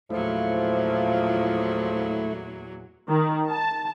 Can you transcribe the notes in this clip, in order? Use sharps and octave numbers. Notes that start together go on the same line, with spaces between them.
E2 A#2 F3 F#3 A3 E4
D#3
A5